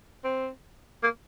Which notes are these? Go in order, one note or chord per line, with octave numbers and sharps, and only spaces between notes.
C4
A#3